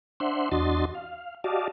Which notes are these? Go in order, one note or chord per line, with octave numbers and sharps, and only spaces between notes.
D4 C5 E5 F#5 C6
E2 D4 F#4 D#5 C6 A6
F5
F#4 G4 D5 D#5 F5 A5